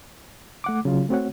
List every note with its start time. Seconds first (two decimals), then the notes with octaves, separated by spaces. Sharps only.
0.64 A3 F#5 D6
0.85 C#3 F#3 F4
1.09 A3 C4 F#4 C#5 F#5